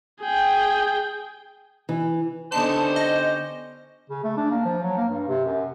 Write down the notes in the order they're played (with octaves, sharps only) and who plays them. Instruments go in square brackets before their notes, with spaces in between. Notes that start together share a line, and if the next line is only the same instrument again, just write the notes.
[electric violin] G#4 G5
[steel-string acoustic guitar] E3
[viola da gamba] D3 B3 D#4 [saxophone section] C#4 G4 C5 [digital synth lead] A5
[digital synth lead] D#5
[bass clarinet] C#3
A3
D4
A#3
F3
F#3
A#3
G2
C3
F#2